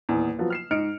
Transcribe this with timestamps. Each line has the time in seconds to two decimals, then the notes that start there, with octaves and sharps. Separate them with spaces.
0.09 D#1 E2
0.39 F3 F#3 B3
0.50 F6 C7 E7
0.71 G#2 D#5 F6 C#7 D7